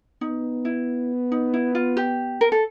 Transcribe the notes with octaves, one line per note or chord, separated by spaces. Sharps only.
B3 D#4
E4
D#4
E4
F4
G4
A#4
A4